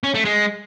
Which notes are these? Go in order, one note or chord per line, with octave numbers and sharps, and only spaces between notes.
C#4
A3
G#3